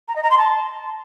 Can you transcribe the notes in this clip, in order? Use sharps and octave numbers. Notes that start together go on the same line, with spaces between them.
A#5
D#5
A#5
C6
A5